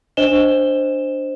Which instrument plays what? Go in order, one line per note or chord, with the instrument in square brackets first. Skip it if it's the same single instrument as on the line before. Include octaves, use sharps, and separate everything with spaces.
[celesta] D4 C5 D#5 E7 G7